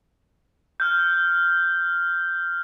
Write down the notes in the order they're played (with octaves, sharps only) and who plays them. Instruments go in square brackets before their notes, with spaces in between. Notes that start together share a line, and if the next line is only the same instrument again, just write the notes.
[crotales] F6 G6